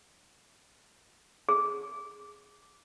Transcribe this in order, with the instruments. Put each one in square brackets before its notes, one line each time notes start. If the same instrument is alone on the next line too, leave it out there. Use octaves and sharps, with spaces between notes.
[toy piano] G#4